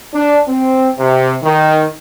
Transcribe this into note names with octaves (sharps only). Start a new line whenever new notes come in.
D4
C4
C3
D#3